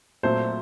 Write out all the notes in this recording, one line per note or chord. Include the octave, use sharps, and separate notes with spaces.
A#2 F#3 A3 C4 C5